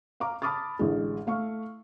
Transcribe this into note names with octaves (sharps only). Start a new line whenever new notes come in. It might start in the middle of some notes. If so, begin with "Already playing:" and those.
F5 A#5 D6
A5 B5 D6 D#6 F6 A6
A1 D3 G#3
A3 F5 C#6